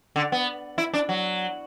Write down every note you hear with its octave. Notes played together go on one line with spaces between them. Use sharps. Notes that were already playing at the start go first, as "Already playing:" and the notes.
D3
B3
E4
D4
F#3